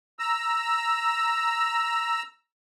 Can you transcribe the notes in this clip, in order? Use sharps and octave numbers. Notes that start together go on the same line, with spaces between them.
A#5 E6